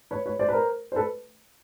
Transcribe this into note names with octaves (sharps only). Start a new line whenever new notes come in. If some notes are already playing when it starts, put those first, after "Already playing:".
B4 C#5
B4 C#5
C5 D5
B4
A#4 C5
C5
A4 B4